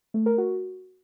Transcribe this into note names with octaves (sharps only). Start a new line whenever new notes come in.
A3
A#4
F#4